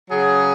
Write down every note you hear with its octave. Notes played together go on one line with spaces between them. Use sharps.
C#3 F#3 G#4